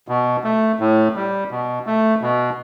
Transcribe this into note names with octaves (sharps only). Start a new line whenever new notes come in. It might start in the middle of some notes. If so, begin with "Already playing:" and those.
B2
A3
A2
G3
B2
A3
B2